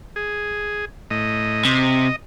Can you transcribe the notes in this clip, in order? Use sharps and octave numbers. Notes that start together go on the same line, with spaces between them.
G#4
A2 D#5
C3 D#5